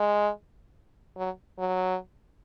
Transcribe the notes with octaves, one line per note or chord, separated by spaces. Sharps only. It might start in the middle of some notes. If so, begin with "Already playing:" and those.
Already playing: G#3
F#3
F#3